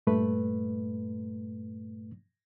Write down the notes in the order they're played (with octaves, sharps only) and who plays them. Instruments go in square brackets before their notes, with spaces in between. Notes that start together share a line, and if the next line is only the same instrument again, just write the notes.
[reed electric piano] G2 A#2 A3 B4